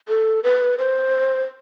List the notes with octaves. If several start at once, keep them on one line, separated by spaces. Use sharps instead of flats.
A4
B4
C5